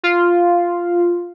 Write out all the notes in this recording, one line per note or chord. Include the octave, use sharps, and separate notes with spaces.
F4